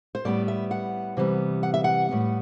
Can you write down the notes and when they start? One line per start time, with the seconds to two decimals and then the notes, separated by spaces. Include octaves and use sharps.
0.15 C5
0.25 A2 G3 B3 D5
0.48 E5
0.71 F#5
1.17 C3 E3 G3 B3
1.63 F#5
1.74 E5
1.84 F#5
2.09 A2 G3 B3